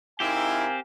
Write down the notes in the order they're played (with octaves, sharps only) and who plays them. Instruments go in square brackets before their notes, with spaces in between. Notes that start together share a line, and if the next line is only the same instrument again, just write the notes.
[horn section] G#2 D#4 E4 [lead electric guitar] C4 G4 [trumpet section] A#4 F5 G#5